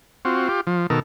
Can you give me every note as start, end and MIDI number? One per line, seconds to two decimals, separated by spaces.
0.25 0.48 60
0.25 0.48 65
0.25 0.48 66
0.49 0.61 65
0.49 0.61 67
0.67 0.87 53
0.90 1.00 47
0.90 1.00 51
0.90 1.00 69
0.90 1.00 70